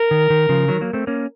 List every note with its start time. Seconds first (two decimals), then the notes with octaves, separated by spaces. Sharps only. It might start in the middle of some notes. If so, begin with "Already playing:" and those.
Already playing: A#4
0.11 D#3
0.30 D#3
0.49 C#3 F3
0.68 D#3 F#3
0.81 F#3 A#3
0.93 A3 C4
1.07 A#3 C#4